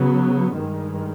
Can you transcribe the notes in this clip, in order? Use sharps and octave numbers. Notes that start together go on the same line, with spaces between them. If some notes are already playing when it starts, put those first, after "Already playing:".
Already playing: C#3 F#3 B3
G2 D#3 G#3